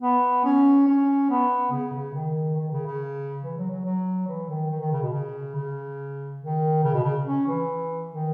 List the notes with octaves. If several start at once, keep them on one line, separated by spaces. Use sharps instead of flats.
B3
C#4
C#4
B3
C#3
C#3
D#3
D#3
C#3
C#3
E3
F#3
F#3
F#3
E3
D#3
D#3
D#3
C#3
B2
C#3
C#3
D#3
C#3
B2
C#3
C#4
E3
D#3